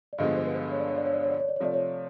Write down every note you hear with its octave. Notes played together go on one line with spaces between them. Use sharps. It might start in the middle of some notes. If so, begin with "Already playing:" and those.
D5
G2 D3 F3 G#3 B3 D#5
C5
B4
C5
C#5
D5
C#5
D5
C#5
D5
C#5
D5
C#5
D5
C#5
C3 F3 A3 D5
C#5